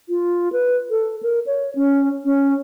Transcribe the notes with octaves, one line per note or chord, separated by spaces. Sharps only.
F4
B4
A4
A#4
C#5
C#4
C#4